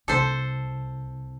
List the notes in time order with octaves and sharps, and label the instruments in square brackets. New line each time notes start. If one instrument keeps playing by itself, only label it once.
[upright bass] C2 [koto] A4 C5